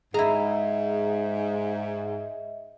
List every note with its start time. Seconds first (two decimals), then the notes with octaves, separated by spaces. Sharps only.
0.14 G#2 E4 G#4 D#5 E5 A#5